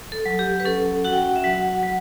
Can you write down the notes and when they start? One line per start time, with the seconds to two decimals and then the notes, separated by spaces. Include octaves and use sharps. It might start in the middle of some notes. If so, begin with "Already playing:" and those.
0.12 A4
0.26 F#3
0.39 G4
0.60 B4
0.65 C#4 A4
1.05 F#4 F#5
1.13 G5
1.20 F#5
1.36 E5
1.44 F#3 F#5
1.83 F#3